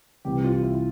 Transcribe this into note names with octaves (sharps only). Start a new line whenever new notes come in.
C2 C3 E3 G4
F4
E4